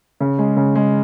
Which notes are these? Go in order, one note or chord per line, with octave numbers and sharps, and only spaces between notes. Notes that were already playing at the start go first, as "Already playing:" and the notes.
C#3
G#3
C#3
G#3